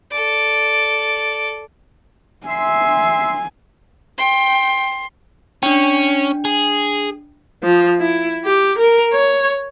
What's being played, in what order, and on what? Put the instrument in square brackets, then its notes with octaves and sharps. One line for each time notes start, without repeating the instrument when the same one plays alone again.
[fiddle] A4 D5
[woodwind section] E5 C6 [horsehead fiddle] G#5
[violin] G5 [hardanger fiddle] C6
[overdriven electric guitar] C#4 [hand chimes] D4 G5
[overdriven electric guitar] G#4
[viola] F3
E4
G4
A#4
C#5